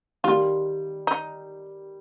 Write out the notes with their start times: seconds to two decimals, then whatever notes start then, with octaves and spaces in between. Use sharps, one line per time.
0.24 D#3 G3 F4
1.07 D#4